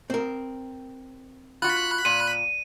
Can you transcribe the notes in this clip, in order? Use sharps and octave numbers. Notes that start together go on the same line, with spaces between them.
C4 A#4
F4 F#4 B5 F#6
A#2 D#7